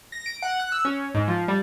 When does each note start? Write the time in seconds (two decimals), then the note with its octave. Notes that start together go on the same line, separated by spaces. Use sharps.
0.12 A#6
0.26 D7
0.42 F#5
0.60 F#6
0.72 E6
0.85 C#4
1.15 G#2
1.28 F3
1.48 G3